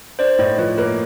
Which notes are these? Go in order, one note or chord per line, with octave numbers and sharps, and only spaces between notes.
D4 C5 D5
A2 C#5 D#5
F3 B4 C#5
A#3 B4 C#5